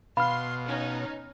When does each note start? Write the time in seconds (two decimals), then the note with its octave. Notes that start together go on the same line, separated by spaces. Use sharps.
0.17 B2 F5 B5 C6 F6
0.66 C#4 D#4 C#5